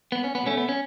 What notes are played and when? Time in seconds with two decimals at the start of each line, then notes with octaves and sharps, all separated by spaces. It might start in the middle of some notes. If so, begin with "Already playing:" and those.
0.12 B3
0.24 C#4
0.35 B3
0.43 B2 A3 C#4
0.57 B3
0.69 C#4